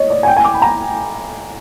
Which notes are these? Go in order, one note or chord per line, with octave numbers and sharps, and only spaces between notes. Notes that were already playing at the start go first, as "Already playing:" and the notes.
Already playing: C#5 D#5
D5
G#5
G5
G#5
D6
B5
A#5